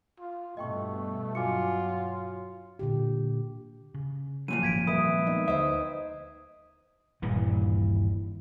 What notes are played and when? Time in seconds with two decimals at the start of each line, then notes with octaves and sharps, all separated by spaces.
0.20 F4
0.57 G2 B2 A3 D#5 G5 C#6
1.35 F#3 F4 G#5 D6 C#7
2.79 A#2 D3 G4
3.94 C#3
4.48 F#2 A#2 F3 D#7
4.63 F#1 G#2 D#3 G#6 B6 D7
4.87 D#3 G3 C4 B4 E5 D#6
5.27 D#3 G#3 B3
5.48 D2 C5 E5 D#6
7.22 D#1 G2 A#2 E3